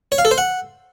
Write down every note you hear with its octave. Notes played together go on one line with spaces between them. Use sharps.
C#5
F5
A4
C5
F#5